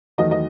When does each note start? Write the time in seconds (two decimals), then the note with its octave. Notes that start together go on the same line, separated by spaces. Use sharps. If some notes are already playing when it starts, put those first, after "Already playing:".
0.18 E2 D#3 F#3 A3 D#5
0.31 D#5